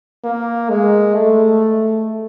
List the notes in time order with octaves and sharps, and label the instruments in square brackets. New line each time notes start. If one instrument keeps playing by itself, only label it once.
[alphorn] A#3
G#3
A3